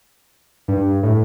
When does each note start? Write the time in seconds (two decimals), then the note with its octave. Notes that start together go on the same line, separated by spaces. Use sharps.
0.68 G2
1.03 A2